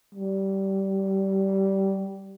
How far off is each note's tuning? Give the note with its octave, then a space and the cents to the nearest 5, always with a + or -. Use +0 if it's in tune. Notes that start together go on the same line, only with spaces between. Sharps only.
G3 -20